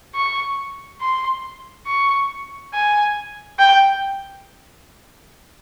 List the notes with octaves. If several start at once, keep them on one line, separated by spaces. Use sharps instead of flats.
C#6
C6
C#6
G#5
G5